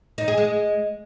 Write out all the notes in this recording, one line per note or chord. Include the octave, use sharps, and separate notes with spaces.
D#4
G#4
G#3